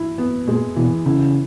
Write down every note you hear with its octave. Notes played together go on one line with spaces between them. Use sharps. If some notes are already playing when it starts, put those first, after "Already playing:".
Already playing: E3 E4
B3
A#2 G#3
B2 E3
C#3 E4